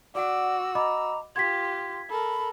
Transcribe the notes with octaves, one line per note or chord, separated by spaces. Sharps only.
F#4 D5 F#5 D6 E6
D#5 A#5 B5 D6
F4 G4 C6 G#6 B6
A4 A#4 B5